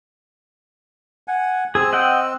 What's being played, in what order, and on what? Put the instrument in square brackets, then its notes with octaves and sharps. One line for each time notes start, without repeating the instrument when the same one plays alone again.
[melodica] F#5 G#5
[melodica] C4 E6 [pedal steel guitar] G#4
[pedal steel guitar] D#5 F#5 G5